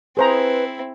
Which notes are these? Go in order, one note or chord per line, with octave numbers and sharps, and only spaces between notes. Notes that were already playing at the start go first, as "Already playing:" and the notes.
C4 E4 G#4 B4 C5 A#5